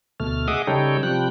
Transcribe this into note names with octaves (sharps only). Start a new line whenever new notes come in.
D2 B2 A3 F6
G#4 D#5 E5 F#5 D6 D#6
C#3 G3 D#4 A4 C#5 G5
C3 F3 G3 G5 F#6